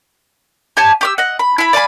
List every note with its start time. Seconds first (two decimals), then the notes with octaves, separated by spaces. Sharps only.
0.77 G4 C#5 G#5 A5
1.01 G4 D6 E6
1.18 D#5 F#5
1.39 B5
1.58 E4 B5
1.73 D5 F5 G#5 B5